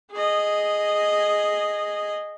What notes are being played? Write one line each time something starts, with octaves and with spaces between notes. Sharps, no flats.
G#4 D#5